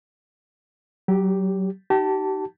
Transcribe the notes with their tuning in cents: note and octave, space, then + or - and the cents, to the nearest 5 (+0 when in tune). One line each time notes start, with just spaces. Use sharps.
F#3 +30 G4 +0
D#4 +0 G4 -35 A5 +10